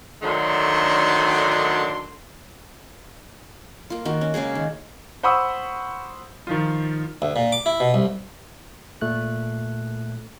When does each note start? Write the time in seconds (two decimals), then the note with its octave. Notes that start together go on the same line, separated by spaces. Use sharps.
0.22 D3 D#3 F#3 A3 D4 C6
3.90 A#3 F4
4.05 D#3 A#3 F#4
4.21 C#4
4.34 C#3 G#3 A#3 G#4
4.55 D#3
5.23 C5 F#5 B5 C#6 D#6 E6
6.47 D#3 F3 F4
7.22 D2
7.36 A#2
7.52 D6
7.66 E4
7.80 B2
7.94 C2
9.01 A#2 A3 F#6